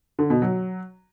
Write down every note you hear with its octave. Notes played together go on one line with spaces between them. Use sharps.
D3
B2
F#3